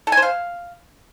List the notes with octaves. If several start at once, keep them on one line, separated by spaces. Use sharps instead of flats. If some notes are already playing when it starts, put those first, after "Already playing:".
A4
G#5
C5
F5